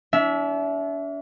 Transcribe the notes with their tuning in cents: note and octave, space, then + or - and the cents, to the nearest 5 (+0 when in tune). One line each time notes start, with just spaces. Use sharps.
D4 -45 E5 +0